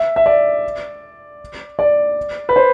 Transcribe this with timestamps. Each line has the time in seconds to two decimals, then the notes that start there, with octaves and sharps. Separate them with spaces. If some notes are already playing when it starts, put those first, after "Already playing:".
Already playing: E5
0.16 E5
0.26 D5
1.79 D5
2.49 B4
2.56 C5